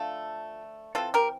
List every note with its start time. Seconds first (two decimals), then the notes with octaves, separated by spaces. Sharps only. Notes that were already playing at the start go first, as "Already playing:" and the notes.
Already playing: D3 F3 A3 F4 A4
0.95 E3 A3 C4 F4 A4
1.14 G4 A#4